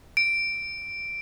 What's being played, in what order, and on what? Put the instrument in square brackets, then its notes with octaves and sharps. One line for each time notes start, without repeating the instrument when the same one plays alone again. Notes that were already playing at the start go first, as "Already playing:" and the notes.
[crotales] D7